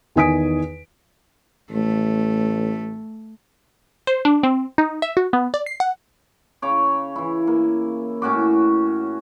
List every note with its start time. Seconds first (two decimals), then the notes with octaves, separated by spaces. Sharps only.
0.16 E2 D#3 G#5 D#6 B6 D7
1.71 A1 A3
4.07 C5
4.25 D4
4.43 C4
4.78 D#4
5.02 E5
5.17 F#4
5.33 B3
5.54 D5
5.66 C7
5.80 F#5
6.62 C#3 C#5 D6
7.16 E3 E4
7.47 A#3
8.22 A2 C#4 F#4 D6